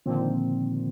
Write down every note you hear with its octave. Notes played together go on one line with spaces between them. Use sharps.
A#2 D3 D#3 F3 A#3 C4